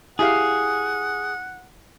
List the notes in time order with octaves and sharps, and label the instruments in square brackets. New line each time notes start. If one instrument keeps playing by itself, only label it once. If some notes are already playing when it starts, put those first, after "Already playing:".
[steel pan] E4 G4 F5 [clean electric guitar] G#4 [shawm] F#5